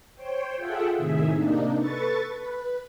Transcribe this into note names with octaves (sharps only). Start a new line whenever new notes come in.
C5 C#5 G5
F4 G#4 A4 E5 F#5 G5
A2 C3 D#3 G#4 E5
C3 A#3 D4 D#4
A4 B4 C#6 A6
B4